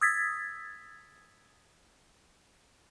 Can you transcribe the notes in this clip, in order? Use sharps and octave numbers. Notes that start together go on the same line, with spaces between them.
D#6 E6 G#6 A6 B6